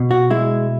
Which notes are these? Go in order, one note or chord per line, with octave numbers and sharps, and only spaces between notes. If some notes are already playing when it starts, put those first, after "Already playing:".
Already playing: B2
F#4
G#3 E4